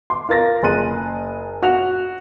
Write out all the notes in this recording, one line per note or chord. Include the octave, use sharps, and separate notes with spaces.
C6 D6
F4 A#4 A6 A#6
F#1 G#4 C6 F#6 D#7
F#4 F#6 F7